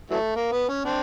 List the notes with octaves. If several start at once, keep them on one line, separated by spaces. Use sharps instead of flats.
E3 F#3 A3
A#3
B3
C#4
C4 D4